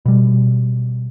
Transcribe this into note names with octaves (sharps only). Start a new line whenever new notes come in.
B2 G3